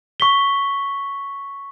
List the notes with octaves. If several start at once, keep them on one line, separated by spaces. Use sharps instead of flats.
C#6 B6 G7